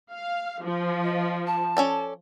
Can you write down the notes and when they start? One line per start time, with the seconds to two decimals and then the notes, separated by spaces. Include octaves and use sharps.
0.11 F5
0.62 F3
1.03 D#5
1.47 A5
1.77 C#4 A4 D5